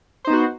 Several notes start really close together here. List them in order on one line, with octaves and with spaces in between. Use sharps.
C5 D#4 B3 F#4